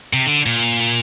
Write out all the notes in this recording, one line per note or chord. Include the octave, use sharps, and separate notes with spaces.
C3
D3
A#2